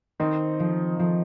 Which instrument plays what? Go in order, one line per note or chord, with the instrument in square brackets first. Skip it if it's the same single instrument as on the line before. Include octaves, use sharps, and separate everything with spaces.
[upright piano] D#3 D#4 [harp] C4
[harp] F3
F3